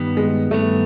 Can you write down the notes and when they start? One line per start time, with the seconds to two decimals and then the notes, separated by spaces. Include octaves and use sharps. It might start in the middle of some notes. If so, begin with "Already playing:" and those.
Already playing: G2 D#3 G3 B3
0.17 G#3
0.51 G2 D#3 G3 A3 B3